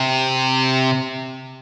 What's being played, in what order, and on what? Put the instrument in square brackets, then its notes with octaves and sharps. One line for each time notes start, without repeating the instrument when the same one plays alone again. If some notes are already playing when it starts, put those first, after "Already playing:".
Already playing: [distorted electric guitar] C3